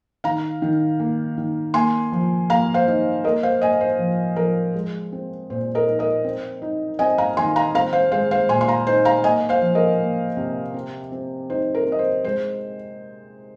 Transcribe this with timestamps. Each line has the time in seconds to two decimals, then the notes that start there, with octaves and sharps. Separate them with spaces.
0.24 D#3 F5 A#5
0.62 D#3
1.00 A#3
1.38 D#3
1.74 A#3 G#5 C6
2.12 F3
2.50 A#3 F5 A#5
2.74 C5 F5
2.88 D#4
3.24 A#3 A#4 D#5
3.43 C5 F5
3.61 A#3 D#5 G#5
3.81 C5
3.99 F3
4.36 F3 A#4
4.74 G#3
5.12 C4
5.50 A#2 C5
5.75 A#4 D#5
5.86 D#4
5.99 A#4 D#5
6.24 C4
6.62 D#4
6.99 C4 D#5 G#5
7.18 F5 A#5
7.37 D#3 G#5 C6
7.56 F5 A#5
7.74 C4 F5 A#5
7.93 C5 F5
8.12 G#3 C5 F5
8.31 C5 F5
8.49 A#2 G#5 C6
8.61 C6
8.68 F5 A#5
8.87 D#4 C5
9.05 F5 A#5
9.24 A#3 D#5 G#5
9.49 C5 F5
9.61 F3
9.75 A#4 D#5
9.99 A#3
10.37 C3
10.74 C4
11.12 C4
11.50 D#4 C5
11.75 A#4
11.87 C4 D#5
11.99 C5
12.24 G#3 C5